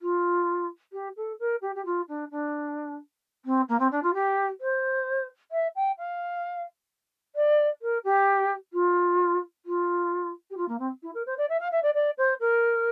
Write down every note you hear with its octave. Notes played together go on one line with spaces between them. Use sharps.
F4
G4
A4
A#4
G4
G4
F4
D4
D4
C4
A#3
C4
D4
F4
G4
C5
E5
G5
F5
D5
A#4
G4
F4
F4
G4
F4
A#3
C4
E4
A#4
C5
D5
E5
F5
E5
D5
D5
C5
A#4